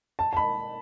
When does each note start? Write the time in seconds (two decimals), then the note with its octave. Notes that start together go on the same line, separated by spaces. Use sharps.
0.19 A5
0.33 A5
0.37 B5